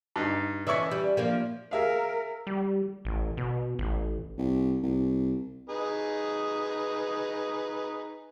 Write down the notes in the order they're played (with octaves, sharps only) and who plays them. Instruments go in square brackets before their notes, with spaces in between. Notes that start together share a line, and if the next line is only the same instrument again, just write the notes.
[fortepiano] G2 D#4
[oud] E3 C#4 [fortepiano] D5 E5 C#6
[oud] G3
F3 A#3 D4
[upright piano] G#4 E5 F5 [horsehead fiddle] A#4
[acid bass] G3
A1
B2
A1
[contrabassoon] C2
C2
[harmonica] D#4 G#4 B4